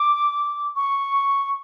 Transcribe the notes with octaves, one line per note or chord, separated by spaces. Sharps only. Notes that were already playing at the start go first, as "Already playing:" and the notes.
Already playing: D6
C#6